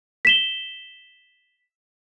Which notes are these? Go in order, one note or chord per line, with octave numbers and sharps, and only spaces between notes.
B6 E7 G7